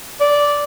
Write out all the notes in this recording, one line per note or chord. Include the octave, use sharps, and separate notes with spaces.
D5